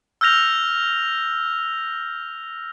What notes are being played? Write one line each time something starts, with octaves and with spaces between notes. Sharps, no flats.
E6 F6 G6 A#6 F7